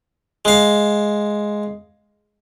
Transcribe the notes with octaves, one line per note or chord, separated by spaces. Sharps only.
G#3 F5